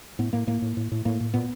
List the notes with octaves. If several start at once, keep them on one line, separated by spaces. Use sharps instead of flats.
A2 B3
A2 A#3
A2 A#3
A2
A2
A2
A2 A#3
A2
A#2 B3